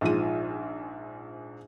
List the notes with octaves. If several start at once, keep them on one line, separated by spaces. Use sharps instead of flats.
A#1 G#2 F3 D#7